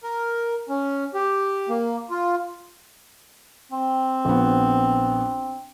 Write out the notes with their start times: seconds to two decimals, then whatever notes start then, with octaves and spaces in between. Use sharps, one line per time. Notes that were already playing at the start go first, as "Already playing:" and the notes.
0.03 A#4
0.69 C#4
1.14 G4
1.69 A#3
2.10 F4
3.72 C4
4.25 A#1 B3